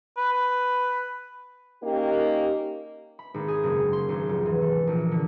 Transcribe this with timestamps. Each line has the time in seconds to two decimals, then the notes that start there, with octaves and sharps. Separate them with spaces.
0.17 B4
1.84 A#3 C#4 D#4 G4
3.19 B5
3.34 G#1
3.48 G#4
3.64 F#1
3.93 C6
4.09 G#1
4.29 F1
4.46 E3
4.62 A4
4.87 A#1
5.11 D3